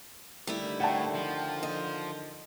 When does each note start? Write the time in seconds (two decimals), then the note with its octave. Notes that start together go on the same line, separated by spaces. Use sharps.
0.47 D3 D#3 G3 A3 E4
0.80 A2 F#5 G5 A5
1.15 F3
1.63 D#5